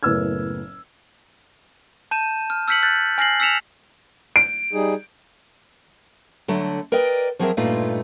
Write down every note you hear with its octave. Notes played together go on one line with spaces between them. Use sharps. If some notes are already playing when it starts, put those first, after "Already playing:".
F#1 A2 B3 E6 F6 G#6
A5 G6 D#7 E7
F6
E6 F6 G6 B6 C#7 F#7
F#6 G6 A6
G#5 F6 A#6 C7 F#7
E6 F6 B6 C#7 E7 F7
D7
G3 D#4 G#4
D3 F#3 A3
A#4 B4 D5 D#5 G5
F3 F#3 C4 G#4 A#4 E5
G2 A#2 A3 D#4 F4